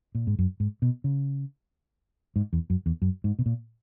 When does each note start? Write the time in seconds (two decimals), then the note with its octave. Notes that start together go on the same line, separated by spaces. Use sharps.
0.15 A#2
0.27 G#2
0.39 F#2
0.60 G#2
0.82 B2
1.04 C#3
2.36 G#2
2.53 E2
2.70 F#2
2.86 E2
3.02 F#2
3.24 G#2
3.39 B2
3.46 A#2